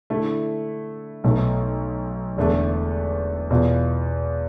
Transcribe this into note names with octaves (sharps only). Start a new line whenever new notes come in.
D3 A3 E4
B1 B2 A3
E1 E2 D3 A3
E2 B2 B3 F4